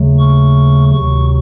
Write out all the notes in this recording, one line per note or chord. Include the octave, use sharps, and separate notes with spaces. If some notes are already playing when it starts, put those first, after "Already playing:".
Already playing: D#2 C#3 F#3 A3
C#6
D2 C3 D#3 F#3 C#6